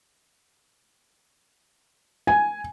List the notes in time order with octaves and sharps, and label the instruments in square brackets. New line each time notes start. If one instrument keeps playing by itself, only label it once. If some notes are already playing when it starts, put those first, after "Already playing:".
[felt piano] G#5